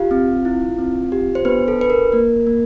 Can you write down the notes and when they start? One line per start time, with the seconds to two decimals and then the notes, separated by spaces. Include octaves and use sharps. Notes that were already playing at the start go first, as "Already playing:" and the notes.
Already playing: F4 G4 F5
0.11 C4
0.45 E4
0.79 C4
1.12 G4
1.35 C5
1.45 B3 D4 B4
1.68 A4
1.79 D4 B4
1.90 A#4
2.12 A#3 A#4
2.47 A#3